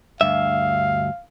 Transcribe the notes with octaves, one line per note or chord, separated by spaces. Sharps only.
D2 G2 E5 F5